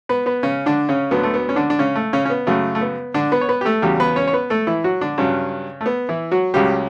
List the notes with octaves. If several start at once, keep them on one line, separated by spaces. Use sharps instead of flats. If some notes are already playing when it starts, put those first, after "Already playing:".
B3 B4
B3 B4
C#3 C#4
D3 D4
C#3 C#4
D2 D3 F#3 B3
A3
B3
C#4
D3 D4
D4
C#3 C#4
A3
C#3 C#4
C#4
B3
F#2 C#3 F#3 A3
A3
B3
D3 D4
B3 B4
C#5
B3 B4
G4
A3 A4
E2 C#3 F#3 G3 G4
B3 B4
C#4 C#5
C#5
B3 B4
A3 A4
E3 E4
F#3 F#4
D3 D4
G2 C#3 F#3 C#4
A3
B3
E3 E4
F#3 F#4
C#2 C#3 F#3 G3 G4